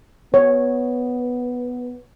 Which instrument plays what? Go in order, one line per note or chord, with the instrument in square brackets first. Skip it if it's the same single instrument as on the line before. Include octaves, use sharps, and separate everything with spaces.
[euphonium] B3 [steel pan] C#5